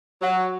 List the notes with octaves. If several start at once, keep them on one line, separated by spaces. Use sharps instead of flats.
F#3